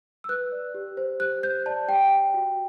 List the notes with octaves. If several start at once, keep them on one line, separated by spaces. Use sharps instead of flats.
E6
B4 F#6
D5
G4
C5
G4 F#6
C5 G6
D5 A5
G4 G5
D5
F#4